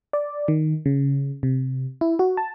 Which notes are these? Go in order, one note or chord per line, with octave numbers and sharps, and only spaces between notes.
D5
D#3
C#3
C3
E4
F#4
A5